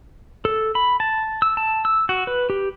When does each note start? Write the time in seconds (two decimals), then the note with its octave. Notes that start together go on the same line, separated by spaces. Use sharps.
0.45 A4
0.75 B5
1.00 A5
1.42 E6
1.57 A5
1.85 E6
2.09 F#4
2.27 B4
2.50 G4